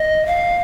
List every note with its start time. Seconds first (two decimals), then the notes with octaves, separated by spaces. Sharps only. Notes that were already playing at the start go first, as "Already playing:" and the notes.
Already playing: D#5
0.26 F5